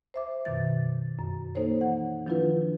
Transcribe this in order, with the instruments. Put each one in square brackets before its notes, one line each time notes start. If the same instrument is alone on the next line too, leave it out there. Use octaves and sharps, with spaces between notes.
[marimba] C5 E5 D6
F#2 B2 D#3 A6
F#2
A#3 D#4 A4 C5 C#5
E3 F#5
D#3 F3 D4 E4 F4 B4